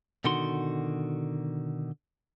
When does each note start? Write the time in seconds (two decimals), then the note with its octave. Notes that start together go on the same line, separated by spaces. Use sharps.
0.24 B2 D3 D#3 F#4 C6